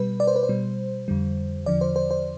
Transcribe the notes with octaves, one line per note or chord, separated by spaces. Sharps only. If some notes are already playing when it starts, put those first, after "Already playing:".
Already playing: B2 G3 B4
D5
C5
B4
C5
B2 G3
F2 D3 G3
E2 D3 F3 D5
C5
C5
C5